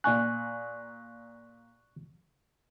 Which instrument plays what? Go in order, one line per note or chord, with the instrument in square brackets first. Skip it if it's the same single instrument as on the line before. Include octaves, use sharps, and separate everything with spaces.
[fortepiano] A#2 G#5 [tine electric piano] C#6 F#6